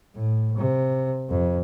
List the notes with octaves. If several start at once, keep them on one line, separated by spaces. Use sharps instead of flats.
A2
C3
F2